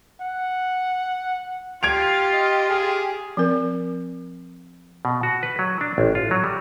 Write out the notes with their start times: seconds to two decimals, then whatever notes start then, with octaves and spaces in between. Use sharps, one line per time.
0.21 F#5
1.83 F4 G4 G#6 D7 F7
2.33 D#5
2.69 G#4
3.37 F3 C4 A#4
5.05 B2
5.23 F#4
5.43 B4
5.59 F#3
5.81 D4
5.98 A1
6.15 F4
6.31 F#3
6.44 G3